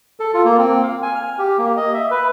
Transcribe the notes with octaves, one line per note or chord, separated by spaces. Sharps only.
A4
F4
A#3
C4
F5
G#5
F6
G4
A#3
D#5
E5
B4